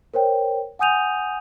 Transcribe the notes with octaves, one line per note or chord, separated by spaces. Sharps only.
A#4 C5 C#5 G5
F#5 G#5 D#6 G6 D#7 F7